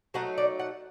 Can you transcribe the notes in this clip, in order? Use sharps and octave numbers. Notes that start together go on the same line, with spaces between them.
F#3 A3 D#4 F#5
D5
F#5